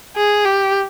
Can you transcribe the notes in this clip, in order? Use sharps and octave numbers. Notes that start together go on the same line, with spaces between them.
G#4
G4